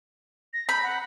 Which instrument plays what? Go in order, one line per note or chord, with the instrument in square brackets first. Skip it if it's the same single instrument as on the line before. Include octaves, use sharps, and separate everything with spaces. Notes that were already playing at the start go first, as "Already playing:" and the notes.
[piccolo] A#6
[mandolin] B5 [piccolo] G6
[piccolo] F#5